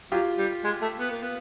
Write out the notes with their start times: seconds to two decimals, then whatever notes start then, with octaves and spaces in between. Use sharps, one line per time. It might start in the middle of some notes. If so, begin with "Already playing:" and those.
0.11 F#3 F4 G4
0.38 G3
0.64 G#3
0.82 A3
0.99 B3
1.10 A#3
1.22 B3